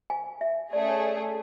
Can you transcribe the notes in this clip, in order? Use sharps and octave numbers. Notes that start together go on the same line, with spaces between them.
G#5
E5
A3 C#4 G#4 D5
C#5